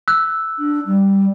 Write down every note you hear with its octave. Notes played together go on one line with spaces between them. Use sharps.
E6 F#6
D4
G3